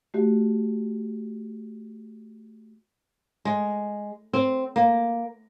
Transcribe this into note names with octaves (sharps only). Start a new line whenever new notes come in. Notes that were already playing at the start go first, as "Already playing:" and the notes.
A3 F#4 G4
G#3
C4
A#3